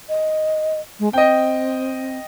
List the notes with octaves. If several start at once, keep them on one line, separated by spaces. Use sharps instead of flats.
D#5
G#3
C4 D#5 G5